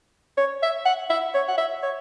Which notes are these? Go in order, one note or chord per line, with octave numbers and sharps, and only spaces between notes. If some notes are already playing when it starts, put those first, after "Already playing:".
C#5
E5
F#5
E5
C#5
F#5
E5
C#5